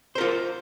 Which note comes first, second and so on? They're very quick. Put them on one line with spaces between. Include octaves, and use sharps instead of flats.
C5 A#4 F4